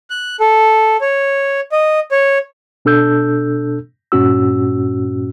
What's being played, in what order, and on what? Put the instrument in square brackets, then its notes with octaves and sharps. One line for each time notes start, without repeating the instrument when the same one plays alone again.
[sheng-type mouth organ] F#6
A4
C#5
D#5
C#5
[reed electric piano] B2 D4 A4 E6 G6
G2 A#2 C#4 F#4 E6